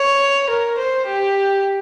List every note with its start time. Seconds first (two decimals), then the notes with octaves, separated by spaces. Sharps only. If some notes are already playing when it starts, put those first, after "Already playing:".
Already playing: C#5
0.50 A#4
0.78 C5
1.06 G4